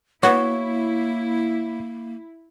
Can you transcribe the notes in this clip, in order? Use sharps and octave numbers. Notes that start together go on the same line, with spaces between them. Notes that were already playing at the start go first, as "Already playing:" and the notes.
A#3 B3 E4 F#4 C#5